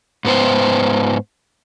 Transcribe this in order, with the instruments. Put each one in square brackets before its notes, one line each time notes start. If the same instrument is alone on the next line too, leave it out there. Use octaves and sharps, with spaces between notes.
[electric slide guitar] G#2 B3 C5